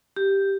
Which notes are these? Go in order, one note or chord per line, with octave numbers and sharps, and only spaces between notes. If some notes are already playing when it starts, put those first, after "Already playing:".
G4